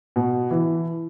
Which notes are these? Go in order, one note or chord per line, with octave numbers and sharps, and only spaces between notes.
B2
E3